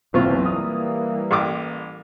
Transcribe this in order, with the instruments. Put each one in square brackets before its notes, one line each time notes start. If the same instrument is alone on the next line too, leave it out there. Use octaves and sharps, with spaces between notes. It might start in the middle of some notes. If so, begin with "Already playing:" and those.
[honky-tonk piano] F#1 B1 C4 [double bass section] E3 [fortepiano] F4 F5 C#6
[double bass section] E3 G3 A#3 [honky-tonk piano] D#6
[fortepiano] A1 G5 D6